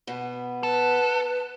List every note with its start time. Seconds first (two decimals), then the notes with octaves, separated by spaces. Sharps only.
0.07 B2 B3
0.63 A4 B4